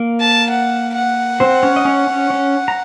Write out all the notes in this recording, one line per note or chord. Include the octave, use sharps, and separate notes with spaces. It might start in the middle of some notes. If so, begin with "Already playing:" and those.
Already playing: A#3 A#4
A5
F#5
F#5
C4 C5
C#4 C#5
D#5
C#4 C#5
C#4 C#5
C#4 C#5
A#5